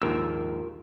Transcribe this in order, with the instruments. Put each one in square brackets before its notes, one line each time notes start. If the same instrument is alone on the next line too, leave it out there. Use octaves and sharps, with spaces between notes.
[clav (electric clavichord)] A#1 D#2 G#2 [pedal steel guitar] F4 A#4 E6